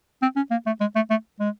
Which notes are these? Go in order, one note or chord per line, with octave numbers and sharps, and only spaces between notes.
C4
C#4
A#3
A3
G#3
A3
A3
G#3